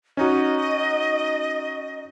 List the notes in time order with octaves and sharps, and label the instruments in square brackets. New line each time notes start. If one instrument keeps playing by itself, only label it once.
[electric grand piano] C#4 D#4 F#4 [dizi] D#5